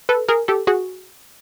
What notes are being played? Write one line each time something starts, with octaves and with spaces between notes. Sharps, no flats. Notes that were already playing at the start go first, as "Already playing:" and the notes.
A4 B4
G#4 A#4
G4 A4
F#4 G#4